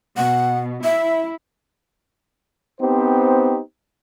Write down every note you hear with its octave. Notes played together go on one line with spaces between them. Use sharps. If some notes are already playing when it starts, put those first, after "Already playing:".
B2 F#5
E4 E5
B3 C4 D#4 G4 C5